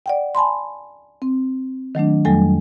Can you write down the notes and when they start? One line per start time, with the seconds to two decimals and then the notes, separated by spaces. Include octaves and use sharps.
0.06 D5 F#5 G5
0.35 G#5 A5 B5 C6
1.22 C4
1.95 D#3 F#3 A3 D4
2.25 F2 F#3 G3 A3 A4 G#5